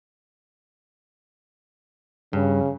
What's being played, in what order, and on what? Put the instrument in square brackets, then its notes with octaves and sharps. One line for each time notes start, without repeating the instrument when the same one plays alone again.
[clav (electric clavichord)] G2 [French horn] C#3